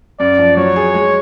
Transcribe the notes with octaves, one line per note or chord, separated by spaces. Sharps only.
F#2 D5
F3
F#3 C#5
G#4
G#3